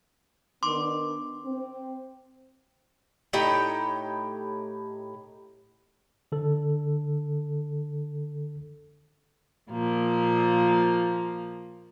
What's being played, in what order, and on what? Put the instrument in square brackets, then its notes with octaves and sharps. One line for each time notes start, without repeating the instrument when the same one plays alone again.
[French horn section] D#3 B3 D4 [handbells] C6 D6
[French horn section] C4
[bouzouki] A2 D#4 G4 G5
[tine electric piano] D3 A4
[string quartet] A#2 F3 A#3